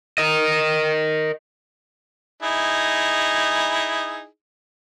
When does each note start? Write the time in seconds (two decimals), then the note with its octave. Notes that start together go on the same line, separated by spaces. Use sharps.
0.18 A#4 D#5
2.42 D#4 E4 G#4